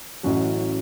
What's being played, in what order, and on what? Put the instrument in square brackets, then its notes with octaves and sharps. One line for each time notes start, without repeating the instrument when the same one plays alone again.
[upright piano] A1 A2 F#3 C#4 F#4